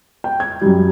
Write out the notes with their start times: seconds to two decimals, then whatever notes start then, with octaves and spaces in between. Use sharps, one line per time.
0.24 G5
0.40 G#6
0.61 F#2 G3